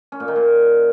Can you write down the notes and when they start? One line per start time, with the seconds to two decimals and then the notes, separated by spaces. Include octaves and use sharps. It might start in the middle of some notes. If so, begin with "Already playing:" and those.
0.12 C#4
0.20 A#2
0.28 D#3
0.36 A#2